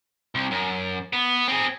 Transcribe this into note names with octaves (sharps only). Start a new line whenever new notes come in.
C2
F#2
B3
C4 G#4